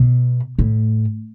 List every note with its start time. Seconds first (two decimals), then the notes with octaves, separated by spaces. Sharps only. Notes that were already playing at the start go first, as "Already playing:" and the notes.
Already playing: B2
0.59 A2